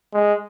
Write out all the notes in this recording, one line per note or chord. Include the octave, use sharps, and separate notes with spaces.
G#3